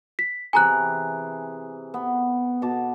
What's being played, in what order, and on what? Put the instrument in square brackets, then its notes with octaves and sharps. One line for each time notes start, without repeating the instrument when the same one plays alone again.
[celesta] B6
[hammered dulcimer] C3 E3 G#4 [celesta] G#5 A#5 F#6
[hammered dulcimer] B3
B2 A5 D6